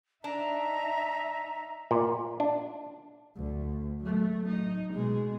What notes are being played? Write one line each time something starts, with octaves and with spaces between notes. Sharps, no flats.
D4 D#4 E5 A#5
A#2
D4
D2
F#3 A3
D#4
B2 G#3